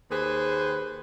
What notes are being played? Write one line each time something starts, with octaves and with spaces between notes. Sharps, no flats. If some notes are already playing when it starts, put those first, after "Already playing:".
D#2 G#4 B4 C5